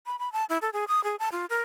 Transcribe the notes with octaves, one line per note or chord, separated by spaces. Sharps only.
B5
B5
A5
E4
A4
G#4
D#6
G#4
A5
F4
A#4